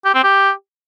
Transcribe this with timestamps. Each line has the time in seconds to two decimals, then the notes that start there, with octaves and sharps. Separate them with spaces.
0.05 G4
0.14 C4
0.23 G4